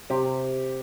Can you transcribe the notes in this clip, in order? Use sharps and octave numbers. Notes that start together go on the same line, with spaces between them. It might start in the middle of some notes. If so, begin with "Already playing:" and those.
C3 G4